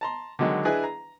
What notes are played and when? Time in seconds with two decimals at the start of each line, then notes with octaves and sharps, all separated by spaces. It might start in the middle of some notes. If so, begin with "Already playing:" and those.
0.01 A5 A#5 C6
0.39 D3 D#3 F#3 G#3
0.65 D4 E4 G#4 B4 D#5 G#5
0.84 A#5